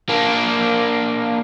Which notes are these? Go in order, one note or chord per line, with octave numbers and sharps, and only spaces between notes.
A#3 D4